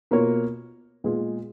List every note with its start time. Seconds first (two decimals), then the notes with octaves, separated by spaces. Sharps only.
0.11 B2 A#3 F4 A#4 C#5
1.04 A#2 G#3 B3 F4 G#4